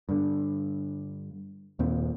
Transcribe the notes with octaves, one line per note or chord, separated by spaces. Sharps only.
G2 D3
D#2 A#2 C4